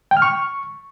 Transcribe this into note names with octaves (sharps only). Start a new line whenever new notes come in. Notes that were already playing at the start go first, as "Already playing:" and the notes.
G5
F6
C#6